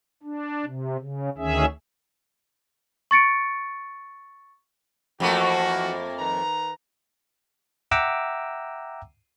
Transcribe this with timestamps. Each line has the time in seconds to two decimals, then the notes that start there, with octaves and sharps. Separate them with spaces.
0.23 D4
0.65 C3
1.00 C#3
1.38 D2 D#3 C#4 G#4 E5
3.11 C#6 A6 C#7 D7
5.20 F2 E3 A3 A#3 F#4
6.19 D#3 B4 A#5
7.91 E5 F#5 G5 A#5 D6 E6